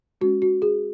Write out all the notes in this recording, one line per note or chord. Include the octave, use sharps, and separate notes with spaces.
G#3 C#4 F#4
F#4
G#4